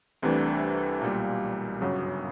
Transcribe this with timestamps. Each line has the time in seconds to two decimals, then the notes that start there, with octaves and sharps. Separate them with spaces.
0.22 C2 C3 E3 A3 D4
1.01 B1 A#2 G3 A#3
1.81 G1 F#2 C#3 F#3